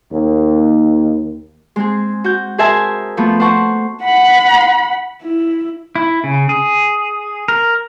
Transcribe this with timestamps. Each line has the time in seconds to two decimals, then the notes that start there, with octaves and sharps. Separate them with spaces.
0.12 D#2
1.76 G#3 C4 G#4
2.24 F#4 G6
2.58 G#4 A#4 C5 E5 G#5 A5
3.17 F3 A3 B3
3.40 C5 F#5 A5 C#6
4.03 F#5 B5
5.23 E4
5.95 E4
6.24 C#3
6.49 G#4
7.48 A#4